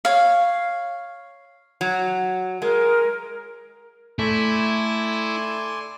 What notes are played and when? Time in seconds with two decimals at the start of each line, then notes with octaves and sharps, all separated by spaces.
0.05 C#5 F5
1.81 F#3
2.62 G#3 A#4
4.19 A3 E4 D5 G#5 C6